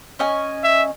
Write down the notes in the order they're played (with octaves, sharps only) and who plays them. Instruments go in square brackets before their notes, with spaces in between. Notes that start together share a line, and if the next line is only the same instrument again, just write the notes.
[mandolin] C#4 D#5 G#5
[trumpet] E5